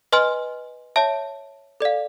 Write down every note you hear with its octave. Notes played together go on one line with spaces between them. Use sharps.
B4 D#5 G#5 C6 F6
C#5 E5 A5
A4 D5 F5